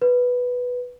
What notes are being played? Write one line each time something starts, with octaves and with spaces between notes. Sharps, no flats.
B4